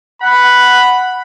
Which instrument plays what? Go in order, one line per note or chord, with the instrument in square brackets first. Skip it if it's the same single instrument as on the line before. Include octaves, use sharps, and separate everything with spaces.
[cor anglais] F#5 [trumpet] B5